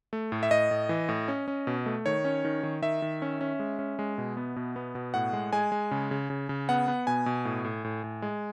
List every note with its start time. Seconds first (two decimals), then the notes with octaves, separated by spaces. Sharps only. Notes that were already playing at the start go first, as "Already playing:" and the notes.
0.13 A3
0.32 A2
0.43 E5
0.51 A2 D#5
0.71 A2
0.89 E3
1.09 A2
1.28 C#4
1.48 C#4
1.67 B2
1.86 A3
2.06 D#3 C#5
2.25 C#4
2.45 D#3
2.63 D#3
2.82 D#3 E5
3.02 D#3
3.22 C#4
3.41 C#4
3.59 G#3
3.79 C#4
3.99 G#3
4.18 B2
4.37 B3
4.56 B2
4.76 B3
4.95 B2
5.14 A2 F#5
5.33 G#3
5.53 G#3 G#5
5.72 G#3
5.91 C#3
6.11 C#3
6.30 C#3
6.49 C#3
6.69 B3 F#5
6.88 B3
7.07 B2 G#5
7.26 B2
7.45 A2
7.65 A2
7.84 A2
8.04 A2
8.22 G#3